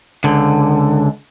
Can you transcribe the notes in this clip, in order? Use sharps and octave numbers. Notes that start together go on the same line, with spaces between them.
C#2 D3